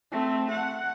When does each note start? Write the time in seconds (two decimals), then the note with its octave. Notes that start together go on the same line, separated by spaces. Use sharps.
0.12 A3 C4
0.52 F#5